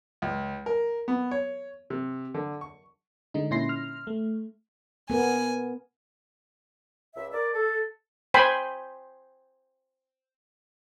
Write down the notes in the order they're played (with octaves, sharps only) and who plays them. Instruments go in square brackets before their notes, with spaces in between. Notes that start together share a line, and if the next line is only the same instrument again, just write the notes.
[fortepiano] C#2
A#4
B3
C#5
C3
D3
C#6
[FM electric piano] D3 G#3 D#4
A#2 C#4 E4 C6 A#6 C7
F6
A3
[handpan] B3 A#4 [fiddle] G#5
[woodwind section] C#2 E5
A#4 D5
A4
[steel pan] C5 G5 G#5 B5 C6